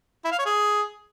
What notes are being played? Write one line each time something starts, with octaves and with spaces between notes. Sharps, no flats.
E4
F5
C#5
G#4